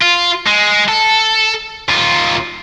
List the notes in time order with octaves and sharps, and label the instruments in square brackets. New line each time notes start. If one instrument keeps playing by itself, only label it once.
[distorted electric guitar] F4
G#3
A4
D#2 F4